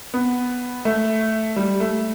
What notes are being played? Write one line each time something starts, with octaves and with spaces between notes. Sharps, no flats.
B3
A3
G3
A3